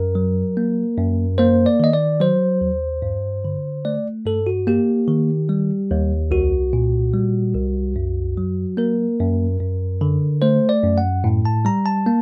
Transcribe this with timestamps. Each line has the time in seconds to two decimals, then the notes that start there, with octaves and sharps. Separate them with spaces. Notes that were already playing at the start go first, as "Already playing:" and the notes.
Already playing: F#2 A#4
0.15 F#3
0.57 A#3
0.98 F#2
1.38 A#3 C5
1.66 D5
1.80 D#3 D#5
1.93 D5
2.20 F#3 C5
2.61 D#2
3.02 G2
3.45 D3
3.85 A3 D5
4.26 G2 A4
4.47 F#4
4.67 A#3 G4
5.08 D#3
5.49 G3
5.91 D#2
6.31 C2 F#4
6.73 A#2
7.13 G3
7.54 C2
7.96 F#2
8.37 F#3
8.77 A#3 A#4
9.20 F#2
9.60 F#2
10.01 D3
10.42 A3 C5
10.69 D5
10.84 F#2
10.98 F#5
11.24 A2
11.45 A5
11.65 G3 A#5
11.86 A5
12.06 A#3